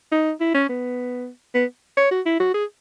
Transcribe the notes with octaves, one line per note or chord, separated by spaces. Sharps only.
D#4
E4
C#4
B3
B3
C#5
F#4
E4
F#4
G#4